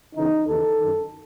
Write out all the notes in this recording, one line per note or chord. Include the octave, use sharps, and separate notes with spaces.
E2 C#3 E3 D#4
D#2 C#3 E3 A4
F#2 D#3